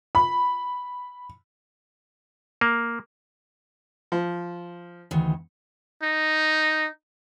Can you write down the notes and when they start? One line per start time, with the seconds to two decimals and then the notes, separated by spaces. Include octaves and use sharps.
0.15 B5
2.61 A#3
4.12 F3
5.11 D2 D#3 E3
6.03 D#4